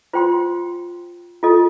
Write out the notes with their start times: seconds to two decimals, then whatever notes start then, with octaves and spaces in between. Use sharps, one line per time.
0.13 F4 C5 G5 C6
1.43 F4 A4 D#5